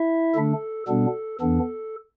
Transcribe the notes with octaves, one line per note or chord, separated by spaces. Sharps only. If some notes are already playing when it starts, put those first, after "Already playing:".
Already playing: E4 E5
D3 A3 D4 A4
B2 G3 B3 D4 A4
E2 E3 B3 D4 A4